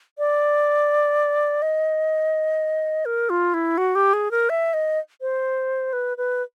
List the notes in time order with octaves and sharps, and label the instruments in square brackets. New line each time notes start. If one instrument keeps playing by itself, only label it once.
[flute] D5
D#5
A#4
F4
E4
F#4
G4
G#4
A#4
E5
D#5
C5
B4
B4